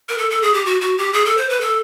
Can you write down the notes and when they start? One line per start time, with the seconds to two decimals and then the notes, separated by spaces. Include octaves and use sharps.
0.09 A#4
0.18 A4
0.30 A4
0.42 G#4
0.54 G4
0.66 F#4
0.81 F#4
0.98 G4
1.13 G#4
1.25 A4
1.37 C5
1.49 B4
1.61 A4